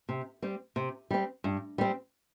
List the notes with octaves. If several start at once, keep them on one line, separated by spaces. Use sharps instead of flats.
C3
G3 C4
C3
G3 C4
G2
G3 C4